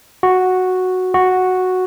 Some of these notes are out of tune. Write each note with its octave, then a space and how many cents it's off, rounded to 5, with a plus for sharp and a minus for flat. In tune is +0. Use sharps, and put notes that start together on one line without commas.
F#4 -5
F#4 -5